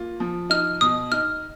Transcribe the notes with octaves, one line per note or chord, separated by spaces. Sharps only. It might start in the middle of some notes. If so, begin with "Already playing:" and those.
Already playing: A#3 F4
F3
D#4 F6
B2 D#6
D#4 F6